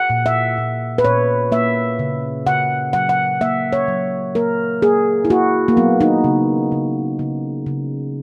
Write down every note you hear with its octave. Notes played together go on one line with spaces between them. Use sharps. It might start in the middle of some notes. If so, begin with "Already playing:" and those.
Already playing: F#5
A#2
E5
A#2
B4
A#2 C#5
A#3 E5
C#3
C#3 F#5
F#3 F#5
F#5
A#3 E5
C#5
F#3
A#3 A#4
A#3 G#4
E4
A#3 F#4
A#3
F#3 B3
D#4
C#3
C#3
C#3
C#3